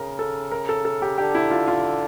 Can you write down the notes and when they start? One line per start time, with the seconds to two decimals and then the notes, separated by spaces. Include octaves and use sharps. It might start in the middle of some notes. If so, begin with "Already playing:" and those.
Already playing: C#3 A#4
0.19 A4
0.52 A#4
0.69 A4
0.85 A4
1.02 G4
1.18 D3 G4
1.35 E4
1.51 F4
1.68 F4